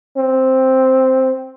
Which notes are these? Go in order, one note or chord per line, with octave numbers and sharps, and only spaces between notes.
C4